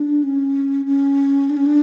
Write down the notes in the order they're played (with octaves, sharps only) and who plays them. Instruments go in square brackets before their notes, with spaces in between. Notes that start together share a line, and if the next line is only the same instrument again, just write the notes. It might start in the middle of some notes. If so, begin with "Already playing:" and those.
Already playing: [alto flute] D4
C#4
C#4
D4
C#4
D4